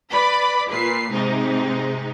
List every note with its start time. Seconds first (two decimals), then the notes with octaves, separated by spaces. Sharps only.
0.11 B4 D5 B5
0.69 A#2 B4 C7
1.11 G#2 C3 D#4